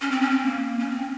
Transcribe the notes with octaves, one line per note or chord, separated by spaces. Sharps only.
C#4
C4
C#4
C4
A#3
C#4
C4